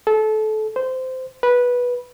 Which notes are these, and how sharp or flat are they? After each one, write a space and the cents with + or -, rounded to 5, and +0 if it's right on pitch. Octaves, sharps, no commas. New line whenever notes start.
A4 -25
C5 -15
B4 -10